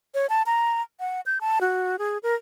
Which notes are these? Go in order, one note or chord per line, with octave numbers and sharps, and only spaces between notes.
C#5
A5
A#5
F#5
G6
A5
F#4
G#4
A#4